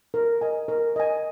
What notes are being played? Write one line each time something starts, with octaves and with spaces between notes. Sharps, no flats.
A#4
D#5 G#5
A#4
D#5 G#5